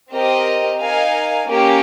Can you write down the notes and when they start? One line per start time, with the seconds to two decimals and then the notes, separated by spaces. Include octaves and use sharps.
0.11 C4 G4 A#4 D#5
0.80 D#4 A#4 F5 G#5
1.48 A#3 C#4 G4